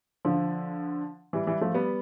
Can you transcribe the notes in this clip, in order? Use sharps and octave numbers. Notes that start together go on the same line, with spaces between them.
D3 F3
E3 G3
E3 G3
F3 A3
G3 B3